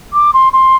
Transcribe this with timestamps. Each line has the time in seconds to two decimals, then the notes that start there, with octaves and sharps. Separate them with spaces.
0.13 D6
0.34 C6
0.53 C6